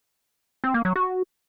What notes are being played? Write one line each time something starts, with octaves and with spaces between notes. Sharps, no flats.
C4
A#3
F#3
F#4